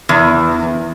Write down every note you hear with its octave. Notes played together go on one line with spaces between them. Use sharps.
E2